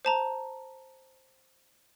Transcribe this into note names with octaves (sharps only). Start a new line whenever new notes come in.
C5 A5 A#5